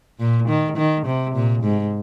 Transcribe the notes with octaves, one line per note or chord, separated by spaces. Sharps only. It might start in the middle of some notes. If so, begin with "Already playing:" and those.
A#2
D#3
D#3
C3
A#2
G#2